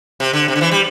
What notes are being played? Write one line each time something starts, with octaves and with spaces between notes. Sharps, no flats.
C3
D3
C3
D3
E3
G3